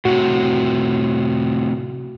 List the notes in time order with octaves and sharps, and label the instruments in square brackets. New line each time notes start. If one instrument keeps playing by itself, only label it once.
[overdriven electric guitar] A2 C3 [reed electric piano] F#4